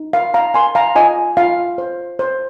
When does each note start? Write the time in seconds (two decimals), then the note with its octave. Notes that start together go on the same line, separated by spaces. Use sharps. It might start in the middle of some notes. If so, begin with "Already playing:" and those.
Already playing: D#4
0.13 A#4 F5
0.34 F5 A#5
0.54 A#4 G#5 C6
0.75 F5 A#5
0.95 F4 D#5 G#5
1.37 F4 F5
1.78 C5
2.19 C5